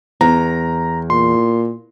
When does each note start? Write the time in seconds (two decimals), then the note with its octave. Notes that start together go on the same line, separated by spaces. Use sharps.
0.21 E2 A#5
1.10 A#2 C6